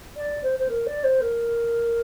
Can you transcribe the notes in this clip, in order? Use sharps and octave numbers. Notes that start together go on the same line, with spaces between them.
D5
C5
C5
A#4
D5
C5
A#4